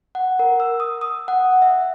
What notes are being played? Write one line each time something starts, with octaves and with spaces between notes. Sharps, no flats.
F#5
A#4
E6
D#6
D#6
F#5
E5